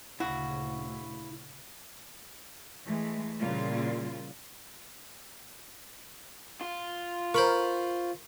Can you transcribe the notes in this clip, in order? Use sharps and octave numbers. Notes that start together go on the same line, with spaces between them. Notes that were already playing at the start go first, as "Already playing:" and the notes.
D2 A#2 C#3 E4 F#4 F5
E3 G#3 A3
A#2 C#3 E3 G3 F4
F4
A#4 C5 B5 C#6